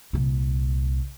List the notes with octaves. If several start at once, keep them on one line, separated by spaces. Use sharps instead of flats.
C2 A#2